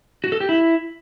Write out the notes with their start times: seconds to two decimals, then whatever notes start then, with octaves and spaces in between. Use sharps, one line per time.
0.24 F#4
0.32 A4
0.40 G4
0.49 E4